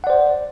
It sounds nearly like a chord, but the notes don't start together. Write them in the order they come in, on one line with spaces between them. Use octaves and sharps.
F#5 D5 C5